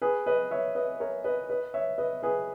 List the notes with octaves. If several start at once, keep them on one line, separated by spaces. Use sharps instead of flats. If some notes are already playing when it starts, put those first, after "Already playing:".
G#4 B4
B4 D#5
C#5 E5
B4 D#5
A#4 C#5
B4 D#5
B4 D#5
C#5 E5
B4 D#5
G#4 B4